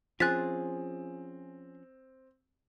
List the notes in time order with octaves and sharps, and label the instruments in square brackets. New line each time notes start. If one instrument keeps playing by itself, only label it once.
[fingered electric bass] F3 C#4 [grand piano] C4 [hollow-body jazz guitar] F4 G#4 [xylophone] F#6 A6 B6